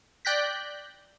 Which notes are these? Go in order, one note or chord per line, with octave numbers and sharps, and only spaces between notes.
D5 G5 F#6 G6 A#6 B6